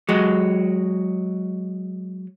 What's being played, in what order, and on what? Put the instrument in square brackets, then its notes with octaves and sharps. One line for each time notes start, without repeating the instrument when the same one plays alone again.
[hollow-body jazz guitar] F#3 G#3